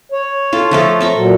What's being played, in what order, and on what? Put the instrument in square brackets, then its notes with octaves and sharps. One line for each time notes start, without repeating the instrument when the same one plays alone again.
[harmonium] C#5
[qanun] F4 A4
F3 A3 A4
A4 E5 A#5
[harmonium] A#2 F#3